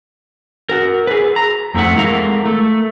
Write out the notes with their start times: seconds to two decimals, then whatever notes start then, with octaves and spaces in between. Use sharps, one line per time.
0.69 F#4 A#4
1.07 G#4 B4
1.36 A#5
1.74 F2 F3 A3 C4 E5 F#5
1.96 G#3 E4 A4 A#4 F5 A#5
2.46 A3